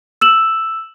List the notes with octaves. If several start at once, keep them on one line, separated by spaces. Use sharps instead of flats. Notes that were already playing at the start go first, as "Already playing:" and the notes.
E6 E7 F#7